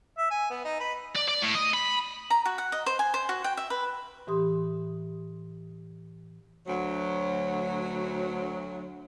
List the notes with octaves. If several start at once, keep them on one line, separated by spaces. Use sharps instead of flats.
E5
G#5
B3
D#4
B4
D5
D5
A2
D#5
B5
A#5
F#4
F#5
D#5
C5
G#5
C5
F#4
G5
E5
B4
A2 E3 G4 C6 D#6
D2 F#3